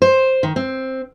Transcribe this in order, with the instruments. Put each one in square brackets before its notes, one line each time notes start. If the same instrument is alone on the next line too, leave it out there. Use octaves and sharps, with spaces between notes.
[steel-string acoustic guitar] C5
D#3
C4